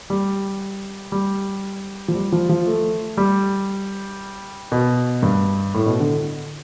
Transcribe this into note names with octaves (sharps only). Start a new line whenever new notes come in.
G3
G3
F3
G3
F3
F3
A3
G3
B2
G2
A2
B2
D3